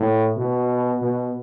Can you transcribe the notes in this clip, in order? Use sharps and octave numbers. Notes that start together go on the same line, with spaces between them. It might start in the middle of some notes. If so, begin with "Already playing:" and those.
Already playing: A2
B2
B2